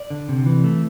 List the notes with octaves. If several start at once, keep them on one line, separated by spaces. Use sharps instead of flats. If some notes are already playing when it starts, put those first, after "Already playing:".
Already playing: D5
D3
C3
E3
A3